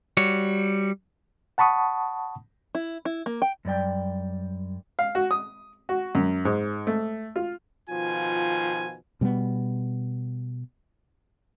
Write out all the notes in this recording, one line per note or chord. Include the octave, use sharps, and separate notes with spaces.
G3 F#4 C#5
F#5 A5 B5 C#6 D#6
E4
E4
A#3
G5
F#2 G3 D5 G5
F5
F#4
D#6
F#4
F#2
G#2
A3
F4
B2 D#3 F3 F4 G#5
B2 G3 A#3 B3